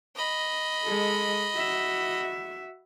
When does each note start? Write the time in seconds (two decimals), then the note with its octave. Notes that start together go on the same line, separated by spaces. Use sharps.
0.16 D#5 B5
0.84 G#3 A4
1.56 F#4 E5